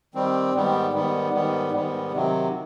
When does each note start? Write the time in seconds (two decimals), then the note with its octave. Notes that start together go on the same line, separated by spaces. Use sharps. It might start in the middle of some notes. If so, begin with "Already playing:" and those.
0.15 D#3 G3 C4
0.53 G#2 D#3 G3 B3
0.93 G#2 D#3 G3 B3
1.33 G#2 D#3 G3 B3
1.72 G#2 D#3 G3 B3
2.12 C3 D#3 F#3